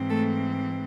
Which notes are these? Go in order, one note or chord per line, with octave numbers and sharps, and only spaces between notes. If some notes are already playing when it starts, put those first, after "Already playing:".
Already playing: G#2 E3 C4
A3 A4